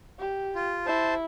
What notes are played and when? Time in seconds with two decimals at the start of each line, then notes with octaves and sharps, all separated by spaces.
0.19 G4
0.55 F4
0.86 E4 C5 A5